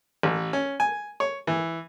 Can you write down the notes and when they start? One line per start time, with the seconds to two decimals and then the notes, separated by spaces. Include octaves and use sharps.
0.23 A1
0.53 C#4
0.80 G#5
1.20 C#5
1.47 E3